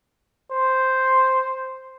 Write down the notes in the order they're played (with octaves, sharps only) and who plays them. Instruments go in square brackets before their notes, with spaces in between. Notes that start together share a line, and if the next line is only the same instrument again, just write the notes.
[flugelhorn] C5